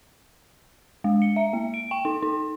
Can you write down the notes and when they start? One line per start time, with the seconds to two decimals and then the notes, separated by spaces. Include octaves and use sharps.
1.04 G#3
1.22 C#7
1.36 E5
1.53 A#3
1.74 D7
1.91 G5
2.05 D#4
2.23 D#4